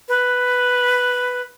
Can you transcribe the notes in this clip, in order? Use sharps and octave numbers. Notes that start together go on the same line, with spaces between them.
B4